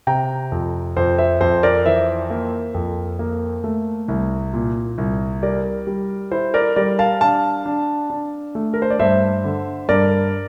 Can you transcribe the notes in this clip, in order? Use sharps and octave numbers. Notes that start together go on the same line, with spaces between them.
C3 G5 A#5
F2
F2 C5
C5 E5
F2 C5
A#4 D5
E3 C5 E5
A#3
F2
A#3
A3
C2
A#2
C2
G3 A#4 D5
G3
E4 C5
A#4 D5
G3 A#4 D5
F5 A5
D4 F5 A5
D4
D4
A3
A#4
C5
D5
G2 C5 E5
D3
G2 A#4 D5